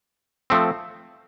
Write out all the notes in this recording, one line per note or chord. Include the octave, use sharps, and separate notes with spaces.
F3 A3 C4